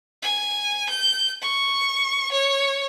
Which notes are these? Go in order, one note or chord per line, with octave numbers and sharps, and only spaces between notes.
G#5
G6
C#6
C#5